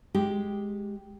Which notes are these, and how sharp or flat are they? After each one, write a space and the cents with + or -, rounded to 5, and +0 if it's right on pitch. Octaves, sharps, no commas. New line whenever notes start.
G#3 +0 G4 +0